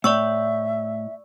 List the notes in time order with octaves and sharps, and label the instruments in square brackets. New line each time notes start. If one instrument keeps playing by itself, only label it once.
[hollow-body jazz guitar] A2 [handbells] D5 C#6 E6 [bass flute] E5